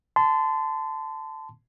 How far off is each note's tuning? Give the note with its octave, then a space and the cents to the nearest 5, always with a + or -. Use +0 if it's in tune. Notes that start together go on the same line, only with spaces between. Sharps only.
A5 +0 C6 -30